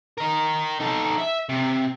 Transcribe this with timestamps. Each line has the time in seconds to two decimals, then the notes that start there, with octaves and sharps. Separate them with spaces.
0.18 A#4 D#5
0.80 D#4 A4
1.18 E5
1.49 C3